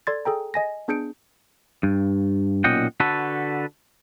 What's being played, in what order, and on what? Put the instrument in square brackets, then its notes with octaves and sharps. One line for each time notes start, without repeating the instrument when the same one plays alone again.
[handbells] A4 D5 C6 G#6 A6
G#4 A4 G5 A#5
D#5 G#5 A#6
B3 D4 G#4 G6 C#7 D7
[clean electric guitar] G2
B1 A#2 C#4 D#5 F#5 G5
D3 F#4 A4 B4